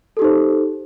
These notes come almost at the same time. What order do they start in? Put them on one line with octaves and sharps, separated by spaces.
A4 G4 D#4 C5